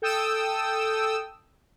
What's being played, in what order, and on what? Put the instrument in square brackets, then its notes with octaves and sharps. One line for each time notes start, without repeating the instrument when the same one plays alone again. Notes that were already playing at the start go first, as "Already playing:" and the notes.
[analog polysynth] A4 G5 D#6 E6